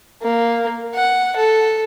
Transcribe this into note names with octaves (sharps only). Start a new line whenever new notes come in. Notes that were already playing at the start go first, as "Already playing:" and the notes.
A#3
F#5
A4